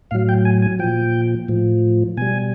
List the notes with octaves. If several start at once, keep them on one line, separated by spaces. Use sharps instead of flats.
A2 F#3 F5
G5
G#5
G#5
A#2 F3 G5
A2 F3
B2 G3 G#5